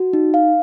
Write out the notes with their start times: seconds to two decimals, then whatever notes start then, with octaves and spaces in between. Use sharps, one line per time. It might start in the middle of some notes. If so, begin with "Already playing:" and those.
Already playing: F#4
0.13 D#4
0.34 F5